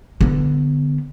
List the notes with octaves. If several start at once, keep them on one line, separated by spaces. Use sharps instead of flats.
D3 B3